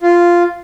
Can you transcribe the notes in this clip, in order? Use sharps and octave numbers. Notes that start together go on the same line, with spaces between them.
F4